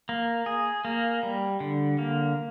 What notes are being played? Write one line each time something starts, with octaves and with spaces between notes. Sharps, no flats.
A#3
G#4
A#3
G3
D3
A#3